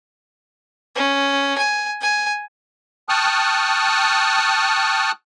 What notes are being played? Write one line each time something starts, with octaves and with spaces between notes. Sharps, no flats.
C#4
G#5
G#5
G5 A5 C#6 D#6 F6 F#6